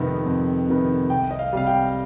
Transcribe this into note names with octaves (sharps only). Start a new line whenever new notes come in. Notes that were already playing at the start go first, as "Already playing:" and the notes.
Already playing: F2 C3 D#3 B3
F2
C3 D#3 B3
C2 G5
D#5
F5
C3 G3 F5
G5